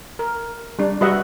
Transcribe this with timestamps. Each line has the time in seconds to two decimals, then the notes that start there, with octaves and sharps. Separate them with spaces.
0.19 A#4
0.79 G3 D4
1.01 G3 F#4 B4 D#5 E5 F#5